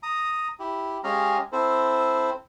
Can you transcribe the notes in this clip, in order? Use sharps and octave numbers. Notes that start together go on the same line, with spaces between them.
A#5 D#6
E4 G4
G#3 C#4 G4 G#4 F5 A#5
C4 E4 A4 C5